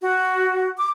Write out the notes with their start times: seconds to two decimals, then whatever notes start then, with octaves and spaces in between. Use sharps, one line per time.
0.01 F#4
0.77 D6